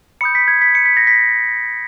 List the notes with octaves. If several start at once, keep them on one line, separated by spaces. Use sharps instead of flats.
B5 D#6 G6 C#7
B6
G#6
B6
C#7
B6
A#6
B6